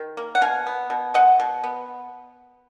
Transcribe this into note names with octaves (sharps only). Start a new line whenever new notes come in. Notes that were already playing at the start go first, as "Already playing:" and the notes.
Already playing: D#3
A#3
F#5
B2 F5 G#5
B3
B2
G#3 D#5 F#5
B2
B3